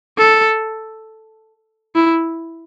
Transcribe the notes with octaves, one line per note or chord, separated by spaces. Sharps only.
A4
E4